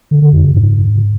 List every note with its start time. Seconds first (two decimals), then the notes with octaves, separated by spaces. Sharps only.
0.11 D3
0.22 D3
0.33 F2
0.43 C#3
0.54 G#2